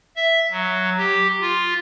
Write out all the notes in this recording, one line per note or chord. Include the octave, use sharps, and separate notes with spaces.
E5
F#3
G4
F4